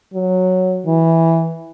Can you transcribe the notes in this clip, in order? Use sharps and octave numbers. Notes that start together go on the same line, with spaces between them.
F#3
E3